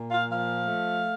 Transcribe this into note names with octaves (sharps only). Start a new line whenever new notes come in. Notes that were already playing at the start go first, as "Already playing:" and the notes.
Already playing: A#2
F5
F3 F5
A3